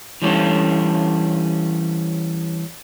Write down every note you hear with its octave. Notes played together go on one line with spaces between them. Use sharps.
E3 G3 C#4 D4 A4